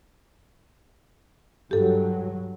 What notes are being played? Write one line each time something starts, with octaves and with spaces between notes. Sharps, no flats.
G2 F#3 G4 A4